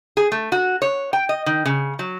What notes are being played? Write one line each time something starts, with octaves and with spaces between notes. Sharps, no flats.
G#4
A3
F#4
C#5
G5
D#5
D#3
C#3
F#3